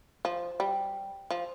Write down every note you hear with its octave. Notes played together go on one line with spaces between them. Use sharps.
F3
G3
F3